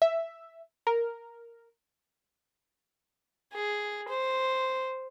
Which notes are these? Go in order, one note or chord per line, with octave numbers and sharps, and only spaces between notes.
E5
A#4
G#4
C5